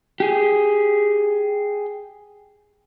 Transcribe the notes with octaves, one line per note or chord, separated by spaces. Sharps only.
G4 G#4